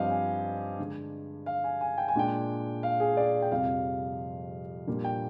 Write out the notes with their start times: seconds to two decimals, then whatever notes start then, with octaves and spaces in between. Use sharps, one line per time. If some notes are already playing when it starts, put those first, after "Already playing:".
Already playing: G2 F3 C4 G4 D#5 F5
0.10 G#5
0.79 D3 G#3 D4
1.46 F5
1.64 G#5
1.81 G#5
1.98 G5
2.08 G#5
2.15 A#2 G#3 D4 G5
2.83 F5
3.00 G#4
3.17 D5
3.42 G5
3.51 F2 C3 G3 C4 F5
4.87 A#2 G3 A#3 D4
5.04 G5